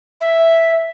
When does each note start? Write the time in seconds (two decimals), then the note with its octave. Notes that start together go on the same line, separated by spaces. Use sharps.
0.21 E5